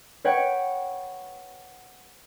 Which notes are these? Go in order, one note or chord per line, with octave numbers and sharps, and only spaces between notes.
B4 C#5 F#5 G5